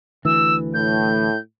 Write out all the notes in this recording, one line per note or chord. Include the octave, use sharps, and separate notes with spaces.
D2 E3 E6
A2 G6